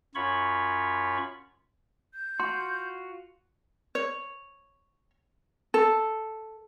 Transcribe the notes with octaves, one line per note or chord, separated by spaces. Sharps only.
F#2 F4 C#5 B5 C#6
G6
F4 F#4 C6
C#5
A4